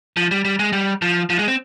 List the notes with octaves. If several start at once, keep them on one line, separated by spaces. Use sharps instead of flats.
F3
G3
G3
G#3
G3
F3
F3
G#3
C4